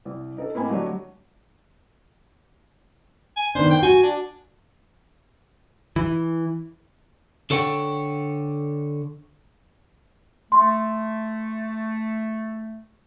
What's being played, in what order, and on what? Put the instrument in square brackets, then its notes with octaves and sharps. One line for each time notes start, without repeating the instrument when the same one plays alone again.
[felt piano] C2
A4 A#4 D#5
A2 A#3 C4 D#5 G#5 B5
D3 F#3 G3 A3 F#4 C#5
[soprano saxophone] G#5
[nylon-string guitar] D#3 B3 D4 [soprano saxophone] C5
[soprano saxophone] G5
[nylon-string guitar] F#4 [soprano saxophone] G#5
[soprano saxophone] D4
[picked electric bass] E3
[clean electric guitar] D3 A4 C#5 F#5 G5
[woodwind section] A3 [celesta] C6